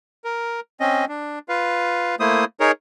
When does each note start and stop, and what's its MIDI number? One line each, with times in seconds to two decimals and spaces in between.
0.24 0.60 70
0.80 1.05 60
0.80 1.05 61
0.80 1.05 75
1.08 1.39 62
1.49 2.15 65
1.49 2.15 71
1.49 2.15 77
2.20 2.45 57
2.20 2.45 58
2.20 2.45 64
2.20 2.45 72
2.20 2.45 87
2.60 2.71 63
2.60 2.71 68
2.60 2.71 70
2.60 2.71 73